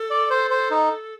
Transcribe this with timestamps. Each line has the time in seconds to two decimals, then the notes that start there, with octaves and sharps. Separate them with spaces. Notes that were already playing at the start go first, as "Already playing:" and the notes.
Already playing: A4
0.11 D5
0.30 C5
0.50 C5
0.71 D#4